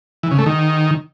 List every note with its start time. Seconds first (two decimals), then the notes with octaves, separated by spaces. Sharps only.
0.23 E3
0.31 C#3
0.39 A3
0.46 D#3